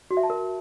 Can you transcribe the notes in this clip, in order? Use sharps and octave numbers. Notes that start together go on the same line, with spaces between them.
F#4
E5
A5
A#4